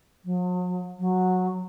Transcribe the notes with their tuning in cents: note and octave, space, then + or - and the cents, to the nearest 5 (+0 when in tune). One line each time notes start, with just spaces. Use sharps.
F#3 -45
F#3 -10